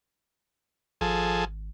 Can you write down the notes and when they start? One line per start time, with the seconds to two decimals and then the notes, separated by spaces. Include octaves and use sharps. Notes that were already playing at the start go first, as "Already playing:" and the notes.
1.01 G#1 F3 G#4 A4